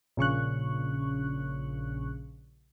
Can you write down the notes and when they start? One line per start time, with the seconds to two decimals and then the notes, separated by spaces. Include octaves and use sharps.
0.17 A#1 C#3 C#6 F#6